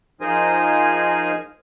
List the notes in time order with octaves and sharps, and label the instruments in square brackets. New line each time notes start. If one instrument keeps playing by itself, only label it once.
[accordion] F3 D#4 G#4 A#4 C5 G#5